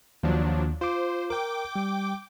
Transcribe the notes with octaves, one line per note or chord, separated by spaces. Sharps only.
D#2 F3 F#3 D4
F4 C5 D6
A#4 G5 D6
G3